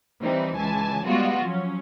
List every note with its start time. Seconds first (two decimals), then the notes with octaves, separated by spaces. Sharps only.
0.21 E3 G3 C4 D#4
0.57 C#2 E3 G#5 A5
1.07 G3 G#3 B3 F4 F#4
1.44 F3 F#3 C#4